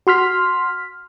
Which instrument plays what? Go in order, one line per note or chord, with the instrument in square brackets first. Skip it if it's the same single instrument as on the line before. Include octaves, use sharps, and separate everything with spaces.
[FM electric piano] F#4 C6 F6 B6